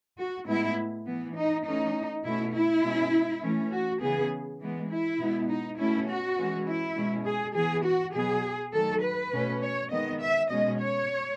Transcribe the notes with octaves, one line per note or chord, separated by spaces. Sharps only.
F#4
A2 G#3 B3 E4
E3 B3
D#4
E3 A3 C#4 D#4
B2 A3 C#4 E4
E4
B2 G#3 C#4
E3 A3 C#4
F#4
C#3 E3 B3 G#4
E3 G#3 B3
E4
B2 G#3 B3
D#4
B2 A3 C#4 E4
F#4
E3 G#3 C#4
E4
B2 G#3 C#4
G#4
E3 B3 G#4
F#4
B2 F#3 B3 G#4
D#3 F#3 A3 A4
B4
B2 A3 C#4
C#5
D#3 G#3 B3 D#5
E5
B2 G#3 C#4 D#5
C#5